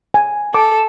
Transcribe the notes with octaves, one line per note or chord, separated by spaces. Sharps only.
G#5
A4 D6